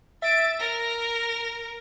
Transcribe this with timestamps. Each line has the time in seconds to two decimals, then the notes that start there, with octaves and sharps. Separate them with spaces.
0.22 E5 A6 D7
0.59 A#4 A#6